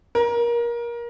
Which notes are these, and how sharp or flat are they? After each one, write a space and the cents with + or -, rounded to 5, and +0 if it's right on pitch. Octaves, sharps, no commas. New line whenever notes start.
A#4 +25